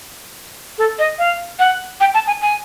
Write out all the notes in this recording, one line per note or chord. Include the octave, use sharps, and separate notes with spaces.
A4
D#5
F5
F#5
G5
A5
G#5
G#5